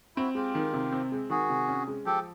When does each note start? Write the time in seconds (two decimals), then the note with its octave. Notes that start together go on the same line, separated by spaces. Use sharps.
0.16 C4 E4 F#4
0.35 G#3 F4 G4
0.55 D#3
0.74 C3
0.92 C4
1.12 G#3
1.30 D#3 F#4 G#4
1.50 C3
1.68 C#4
1.87 G#3
2.05 F3 G4 A4